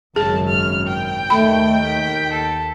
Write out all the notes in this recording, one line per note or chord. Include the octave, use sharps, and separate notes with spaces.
G#1 F#2 C#3 G#4 A5
F6
G5
D#2 D#3 A3 B5
B6
A4